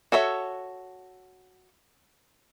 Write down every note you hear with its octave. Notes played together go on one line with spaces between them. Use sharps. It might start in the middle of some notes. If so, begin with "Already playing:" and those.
F#4 A4 C#5 E5